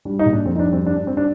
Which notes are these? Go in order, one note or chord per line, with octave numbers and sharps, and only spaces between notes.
G3 D4
D#4
A#2
D4
F2 C4
D#4
D4
G3
C4
G2 D4
D4
G3 C4
D4